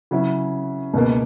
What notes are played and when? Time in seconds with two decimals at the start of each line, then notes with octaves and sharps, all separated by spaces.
0.11 C#3 F#3 C#4 E4
0.93 C#2 B2 A#3